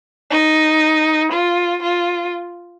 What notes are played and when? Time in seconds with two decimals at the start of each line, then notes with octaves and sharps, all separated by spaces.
0.31 D#4
1.32 F4
1.82 F4